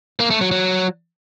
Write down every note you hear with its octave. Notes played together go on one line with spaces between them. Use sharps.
A#3
A3
F#3
F#3